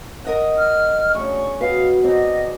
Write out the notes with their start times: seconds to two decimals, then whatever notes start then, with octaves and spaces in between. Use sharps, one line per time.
0.25 A#4 D#5 F#5
0.58 F6
1.15 D2 C#4 G#4 C#6
1.61 B2 B4 D#5 F5 F#5
2.04 F#3 C4 D5 D#5 A#5